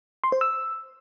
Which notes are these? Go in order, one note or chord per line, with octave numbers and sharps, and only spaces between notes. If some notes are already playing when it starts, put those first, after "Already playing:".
C6
C5
E6